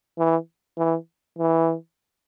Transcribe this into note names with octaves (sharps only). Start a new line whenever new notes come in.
E3
E3
E3